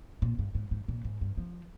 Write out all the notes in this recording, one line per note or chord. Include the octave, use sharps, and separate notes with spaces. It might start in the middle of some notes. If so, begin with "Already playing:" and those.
A#2
G2
G#2
G#2
A#2
G#2
G2
F3